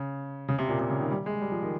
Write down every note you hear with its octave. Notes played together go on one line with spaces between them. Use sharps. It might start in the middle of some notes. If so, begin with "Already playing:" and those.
Already playing: C#3
C#3
C3
A#2
C3
C#3
D#3
G3
G#3
G3
F3
D#3